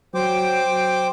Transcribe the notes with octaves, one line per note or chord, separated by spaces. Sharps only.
F#3 C5 G5 D6